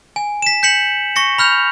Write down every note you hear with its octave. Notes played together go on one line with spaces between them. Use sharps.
G#5
B6 E7
G6 B6 C#7 F#7
C#6 A#6 C#7
B5 F6 G6 F7